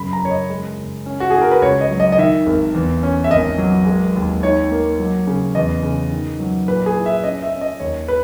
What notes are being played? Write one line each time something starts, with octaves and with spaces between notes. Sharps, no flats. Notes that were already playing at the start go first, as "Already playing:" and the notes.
Already playing: F#2 C#3 B5
A#5
F#1 C#5
D#5
G#3
F#1
C#4
F#4
E4 G#4
A#4
B4
C#2 C#5
D#5
F#3
D#5
D#5
D#3 E5
G#1
E2
C#4
E5
G#1 D#5
F#3
G#3
D#2
D#4 C#5
A#3
F#3
C#3
E2 D#5
C#3
D#3
F#3
A#2 B4
G#4
E4
E5
C#4 D#5
E5
C#4
D#5
D#2 C#5
B4